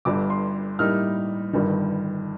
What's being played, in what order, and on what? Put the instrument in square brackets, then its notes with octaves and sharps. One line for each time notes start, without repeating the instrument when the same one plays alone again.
[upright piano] G1 G2 D3 D6
C6
A2 G3 A#3 D#4 F6
G1 G2 D#3